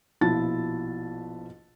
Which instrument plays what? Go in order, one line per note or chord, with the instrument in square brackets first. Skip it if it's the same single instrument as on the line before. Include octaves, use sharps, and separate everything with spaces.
[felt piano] A#1 B2 F3 E4 A5 A6